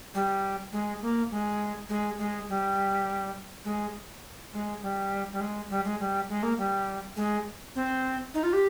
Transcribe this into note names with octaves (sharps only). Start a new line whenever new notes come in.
G3
G#3
A#3
G#3
G#3
G#3
G3
G#3
G#3
G3
G3
G#3
G3
G#3
G3
G#3
A#3
G3
G#3
C4
D#4
F4
G4